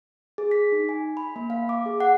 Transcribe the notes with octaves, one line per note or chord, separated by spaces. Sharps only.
G#4
B6
D#4
G#5
B5
A#3
F5
D6
G#4
F#5